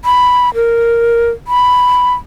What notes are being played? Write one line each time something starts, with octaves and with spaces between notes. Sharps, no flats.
B5
A#4
B5